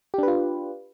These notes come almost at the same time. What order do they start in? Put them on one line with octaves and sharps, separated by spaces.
G4 D4 B4 F4